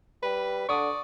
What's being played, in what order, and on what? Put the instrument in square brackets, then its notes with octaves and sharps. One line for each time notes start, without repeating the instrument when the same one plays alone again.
[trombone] G3 [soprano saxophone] B4
[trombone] D3 [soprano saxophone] D5 [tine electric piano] C#6 D#6